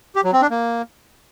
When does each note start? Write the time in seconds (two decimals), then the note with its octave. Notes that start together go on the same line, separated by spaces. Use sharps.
0.16 G4
0.24 F#3
0.33 C4
0.42 D4
0.51 A#3